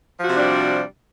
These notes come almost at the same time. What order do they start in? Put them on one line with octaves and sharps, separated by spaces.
F3 F#4 C3 D4 G3